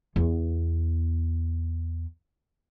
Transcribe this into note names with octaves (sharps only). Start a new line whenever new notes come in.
E2 B3